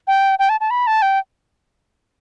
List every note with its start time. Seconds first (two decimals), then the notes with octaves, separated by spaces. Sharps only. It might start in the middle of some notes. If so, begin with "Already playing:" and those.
0.07 G5
0.39 G5
0.49 A5
0.61 A5
0.71 B5
0.87 A5
1.02 G5